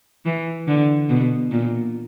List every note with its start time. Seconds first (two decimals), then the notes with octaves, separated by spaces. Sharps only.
0.25 E3
0.68 D3
1.09 B2
1.51 A#2